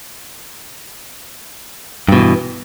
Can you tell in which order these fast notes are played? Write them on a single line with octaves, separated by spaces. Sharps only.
G2 B2 E3